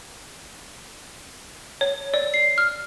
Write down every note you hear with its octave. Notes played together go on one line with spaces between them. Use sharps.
C#5
D5
C7
F6